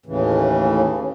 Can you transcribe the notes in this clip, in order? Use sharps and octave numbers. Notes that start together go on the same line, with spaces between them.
D#2 A2 C#3 E3